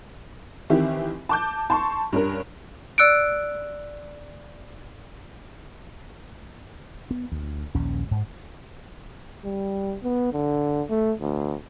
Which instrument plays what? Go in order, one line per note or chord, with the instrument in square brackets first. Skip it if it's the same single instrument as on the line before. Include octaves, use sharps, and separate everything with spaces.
[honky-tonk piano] D#3 E3 C4 E4 G4
A5 D6 G6
A5 C6 C#6
G2 C#4 A#4
[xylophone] D5 E6 F#6 C#7 D7
[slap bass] B3
D2
A#1 D#2 C#4
G#2
[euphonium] G3
B3
D3
A3
D2